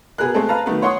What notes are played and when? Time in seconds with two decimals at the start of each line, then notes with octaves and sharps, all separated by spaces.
0.18 B2 B3 G#4 A#4 F#6
0.34 G#3 A3 B3 C4 A4
0.48 B4 F5 A5 A#5
0.66 D#3 F#3 A3 B3
0.82 C#5 F#5 C6 C#6 D#6